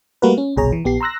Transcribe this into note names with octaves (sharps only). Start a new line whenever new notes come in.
G3 A3 A#3 F#4 A#4 B4
C#4
G1 C2 B2 G#4 C#5 A#5
E3
A#1 B3 G4 C7
A#5 C6 E6 F#6 A#6